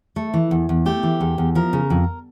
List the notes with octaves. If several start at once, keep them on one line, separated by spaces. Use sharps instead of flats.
A3
E3
E2
E2
A3 G4
E3
E2
E2
F3 A#4
C#3
F2